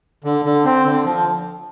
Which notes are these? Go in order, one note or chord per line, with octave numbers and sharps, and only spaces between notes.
D3
D3
C4
D3
F3